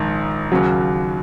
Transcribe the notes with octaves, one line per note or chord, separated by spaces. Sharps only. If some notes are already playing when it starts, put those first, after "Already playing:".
Already playing: A#1 G#2 D#3
D#2 C#3 F#3